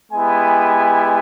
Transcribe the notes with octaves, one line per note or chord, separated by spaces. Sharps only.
G#3 B3 E4 G4 G#5